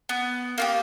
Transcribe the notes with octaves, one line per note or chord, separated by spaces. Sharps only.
B3
A#3 F4 G4